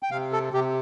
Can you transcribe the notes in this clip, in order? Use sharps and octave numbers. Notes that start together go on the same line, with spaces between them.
G5
C3 F5
A4
C3 G4